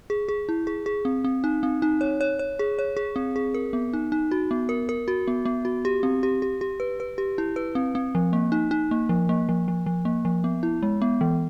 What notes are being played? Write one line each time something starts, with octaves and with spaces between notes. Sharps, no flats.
G#4
G#4
E4
G#4
G#4
C4
C4
D#4
C4
D#4
C#5
C#5
C#5
G#4
C#5
G#4
C4
G#4
A#4
B3
D#4
D#4
F#4
B3
A#4
A#4
F#4
B3
B3
F#4
G4
C4
G4
G4
G4
B4
B4
G4
E4
B4
C4
C4
F3
A#3
D#4
D#4
A#3
F3
A#3
F3
F3
F3
A#3
F3
B3
E4
G#3
B3
E3